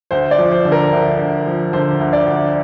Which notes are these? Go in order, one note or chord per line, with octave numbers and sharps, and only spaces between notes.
D2 C5
D5
F3
C5
D3
A#4
D2
D2
F3
D3 C5
D2
D5
D2